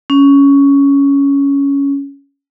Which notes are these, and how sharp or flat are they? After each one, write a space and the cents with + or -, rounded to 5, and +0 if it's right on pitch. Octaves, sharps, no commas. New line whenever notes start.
C#4 +10